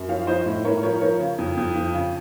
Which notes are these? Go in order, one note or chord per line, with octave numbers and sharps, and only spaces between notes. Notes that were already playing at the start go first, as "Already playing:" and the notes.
Already playing: F#2
F3 C#5 F5
F3 C5 D#5
A2
A2 A#4 C#5
F3 A#4 C#5
F3 A#4 C#5
C#3
F2
F2
F3
C#3